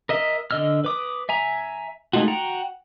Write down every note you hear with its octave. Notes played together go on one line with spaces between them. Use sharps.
A#4 D#5 E5
D3 D#5 E6 F6
B4 D6 D#6
E5 G#5 A#5
G#3 A3 D#4 F4 F#4
F#4 F#5 G5 A#5